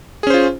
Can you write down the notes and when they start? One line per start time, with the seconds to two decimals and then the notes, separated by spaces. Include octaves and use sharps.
0.23 G#4
0.27 C#4
0.30 C5
0.34 F4